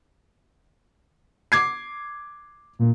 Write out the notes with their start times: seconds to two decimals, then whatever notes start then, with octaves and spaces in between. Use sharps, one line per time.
1.52 D6 G#6 C7
2.79 A#2